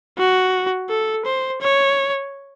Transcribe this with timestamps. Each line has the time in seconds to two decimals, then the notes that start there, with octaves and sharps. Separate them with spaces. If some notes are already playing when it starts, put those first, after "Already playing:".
0.18 F#4
0.90 A4
1.25 C5
1.61 C#5